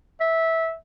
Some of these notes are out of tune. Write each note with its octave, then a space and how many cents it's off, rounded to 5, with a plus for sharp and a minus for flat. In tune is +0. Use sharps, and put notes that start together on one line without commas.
E5 -15